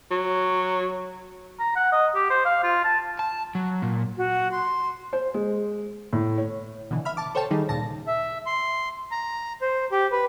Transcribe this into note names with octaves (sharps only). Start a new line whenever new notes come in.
F#3
A#5
F#5
D#5
G4
C5
F5
F4
A5
A5
F#3
A#2
F#4
C6
C5
G#3
A2
C#5
B2 D3 E3
E5 B5 F6
A5 D6
A4 C5 C#5 G5 A5
D#3 G3 D#4 G#4
D#2 A#2 C#3 A5 A#6
E5
C6
A#5
C5
G4
B4